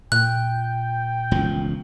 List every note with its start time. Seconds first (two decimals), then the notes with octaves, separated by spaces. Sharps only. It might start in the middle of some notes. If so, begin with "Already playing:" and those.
0.12 A#2 G5 F#6
1.31 E1 C#2 F3